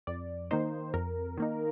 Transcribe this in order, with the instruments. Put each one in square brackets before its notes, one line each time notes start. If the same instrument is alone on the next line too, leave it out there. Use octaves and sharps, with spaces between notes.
[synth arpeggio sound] F2 D5
D#3 A#3 D#4 C5
F2 A#4
D#3 A#3 D#4